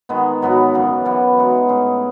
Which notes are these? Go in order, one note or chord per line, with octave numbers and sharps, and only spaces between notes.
D#3 G#3 B3
G#2 F#3 B3 F#4
F#2 C#3 E3
F#2 E3 B3 F#4
G#3 D#4 F#4 B4
A2 G#3 C#4 G#4